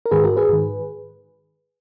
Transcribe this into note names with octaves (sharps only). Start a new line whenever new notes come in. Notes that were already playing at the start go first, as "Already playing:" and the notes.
A#4
G#2 D#3 G#4 B4
F#4 A#4
G#4 B4
G#2 D#3